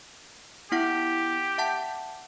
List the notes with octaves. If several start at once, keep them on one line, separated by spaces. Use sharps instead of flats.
B3 E4 G4 F#5
E5 F#5 A5